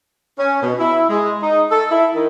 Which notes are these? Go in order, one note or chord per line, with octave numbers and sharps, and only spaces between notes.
C#4
B2
E4
G#3
D#4
A4
E4
D#3